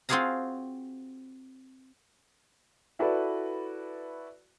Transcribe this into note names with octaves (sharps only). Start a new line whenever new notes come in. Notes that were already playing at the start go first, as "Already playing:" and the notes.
C4 F4 F#4 G#4 F5 A#5
E4 F#4 A4 B4 D5